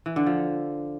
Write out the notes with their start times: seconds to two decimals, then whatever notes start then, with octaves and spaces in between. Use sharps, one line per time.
0.06 E3
0.16 D3
0.26 F3